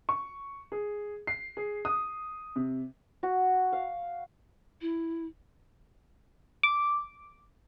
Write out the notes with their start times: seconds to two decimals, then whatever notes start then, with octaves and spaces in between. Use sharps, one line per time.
0.09 C#6
0.72 G#4
1.27 C7
1.57 G#4
1.85 D#6
2.56 C3
3.23 F#4
3.73 F5
4.81 E4
6.63 D6